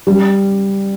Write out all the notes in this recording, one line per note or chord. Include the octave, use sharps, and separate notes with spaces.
G3